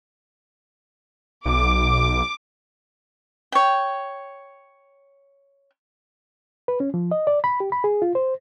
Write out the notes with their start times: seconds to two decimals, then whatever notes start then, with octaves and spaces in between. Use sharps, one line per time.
1.46 B1 D6
3.52 C#5 G5
6.68 B4
6.80 C#4
6.94 F3
7.11 D#5
7.27 D5
7.44 B5
7.60 G4
7.72 B5
7.84 G#4
8.02 F4
8.15 C5